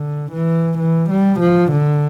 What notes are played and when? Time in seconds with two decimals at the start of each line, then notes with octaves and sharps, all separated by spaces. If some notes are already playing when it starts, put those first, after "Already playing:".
Already playing: D3
0.33 E3
0.79 E3
1.10 G3
1.40 F3
1.72 D3